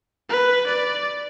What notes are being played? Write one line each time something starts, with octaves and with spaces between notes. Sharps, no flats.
B4
D5